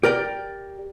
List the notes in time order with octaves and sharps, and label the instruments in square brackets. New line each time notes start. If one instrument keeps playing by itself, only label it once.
[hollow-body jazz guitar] G4 A#4 D5 G5